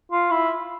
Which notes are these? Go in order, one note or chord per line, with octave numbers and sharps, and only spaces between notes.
F4
E4